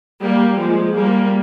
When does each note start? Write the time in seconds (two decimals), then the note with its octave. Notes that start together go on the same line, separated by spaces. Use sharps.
0.21 G3 A#3
0.58 F3 G#3
0.95 G3 A#3